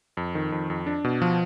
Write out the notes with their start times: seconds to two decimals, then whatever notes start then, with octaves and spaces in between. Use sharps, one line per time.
0.17 F2
0.35 D#3
0.52 F2
0.70 F2
0.87 D4
1.04 B2
1.22 F3